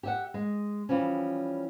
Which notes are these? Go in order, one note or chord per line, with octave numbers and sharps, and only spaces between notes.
G4 E5 F#5
G#3
E3 F3 G3 C#4